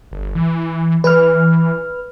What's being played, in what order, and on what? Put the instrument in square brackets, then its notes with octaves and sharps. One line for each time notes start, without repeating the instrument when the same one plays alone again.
[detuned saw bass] G1
E3
[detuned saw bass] E3 [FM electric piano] B4 F6